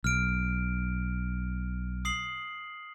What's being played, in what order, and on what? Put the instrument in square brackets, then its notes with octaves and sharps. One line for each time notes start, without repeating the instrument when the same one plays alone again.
[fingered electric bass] B1 [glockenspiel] F6 D7
[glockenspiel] D#6 C7 F#7